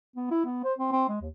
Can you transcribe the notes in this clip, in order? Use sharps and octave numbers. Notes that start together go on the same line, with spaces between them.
B3
E4
B3
C5
C4
C4
G#3
D#2